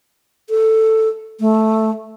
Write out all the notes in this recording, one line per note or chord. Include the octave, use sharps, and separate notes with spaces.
A4
A3